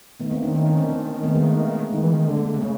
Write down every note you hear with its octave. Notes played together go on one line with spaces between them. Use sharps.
D#3 A3 B3
A#3 C4
C4 D4
C#4 D#4
C#4 D#4
C4 D4
D#3 A#3 C4
A3 B3
G#3 A#3
A3
D#3 G#3
E3
D#3
D3 A3
G#3 A#3
A3
G#3 A#3
C3
C#3 A3